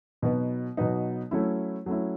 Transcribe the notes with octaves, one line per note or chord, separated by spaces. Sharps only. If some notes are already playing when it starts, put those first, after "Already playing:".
B2 F#3 B3 D#4
B2 F#3 B3 D#4
F#3 A3 C#4 E4
F#3 A3 C#4 E4